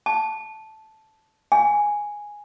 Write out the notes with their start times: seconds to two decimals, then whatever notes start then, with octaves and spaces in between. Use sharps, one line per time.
0.06 A5
1.52 G#5